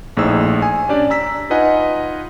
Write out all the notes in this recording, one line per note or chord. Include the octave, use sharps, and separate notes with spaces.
A#1 A2 D#4 G#4 C5 E6
G#5
C#4 D4 G4 D5
A#5 E6 B6
D#4 F4 B4 D#5 F#5 G#5